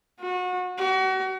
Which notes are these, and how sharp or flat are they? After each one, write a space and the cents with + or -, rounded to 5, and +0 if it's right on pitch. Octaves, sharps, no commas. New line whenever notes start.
F#4 -30
F#4 +35